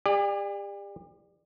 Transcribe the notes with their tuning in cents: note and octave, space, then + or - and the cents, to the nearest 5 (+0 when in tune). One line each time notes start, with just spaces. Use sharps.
G4 +40 D5 +25 G#5 -10